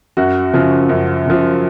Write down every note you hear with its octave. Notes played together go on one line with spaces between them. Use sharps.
F#2 F#4
C#3 F3
F#2
C#3 F3